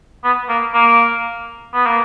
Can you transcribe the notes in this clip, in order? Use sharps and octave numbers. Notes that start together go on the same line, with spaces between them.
B3
A#3
A#3
B3
A#3